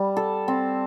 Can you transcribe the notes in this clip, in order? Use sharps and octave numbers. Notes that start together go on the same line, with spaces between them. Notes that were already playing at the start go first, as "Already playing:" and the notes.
Already playing: G3
A4
C4